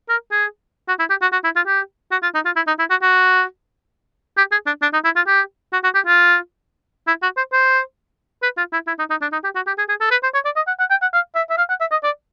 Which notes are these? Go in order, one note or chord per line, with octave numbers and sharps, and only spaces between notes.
A#4
G#4
F#4
E4
G4
F#4
F#4
E4
F4
G4
F#4
F4
D#4
F4
E4
D#4
E4
F#4
F#4
G4
G#4
D4
D4
D#4
E4
F4
G4
F#4
F#4
G4
F4
E4
F#4
C5
C5
B4
F4
E4
E4
D#4
D#4
D4
D#4
G4
F#4
G4
G#4
G#4
A4
B4
C5
C#5
D5
D#5
F#5
F#5
G5
F#5
F5
E5
E5
F5
F#5
E5
D#5
D5